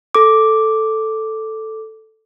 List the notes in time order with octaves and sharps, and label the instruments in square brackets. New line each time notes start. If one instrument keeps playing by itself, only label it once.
[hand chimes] A4 D6